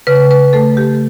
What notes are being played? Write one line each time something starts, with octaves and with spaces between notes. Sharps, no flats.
C#3 B4
B4
A3 A4
G4